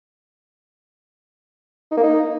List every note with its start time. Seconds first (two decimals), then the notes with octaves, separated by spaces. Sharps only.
1.91 D#4
1.97 A#3
2.03 D#4